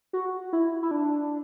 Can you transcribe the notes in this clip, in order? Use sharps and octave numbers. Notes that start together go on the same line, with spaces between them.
F#4
E4
E4
D4